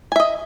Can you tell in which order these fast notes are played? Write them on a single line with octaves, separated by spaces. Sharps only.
G#5 E5 D#5